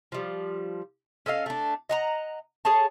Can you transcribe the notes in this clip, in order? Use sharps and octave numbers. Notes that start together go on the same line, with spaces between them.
F3 G3
C#4 A4 D#5 F5
A3 D4
D#5 F#5 A#5
G#4 A4 C#5 A5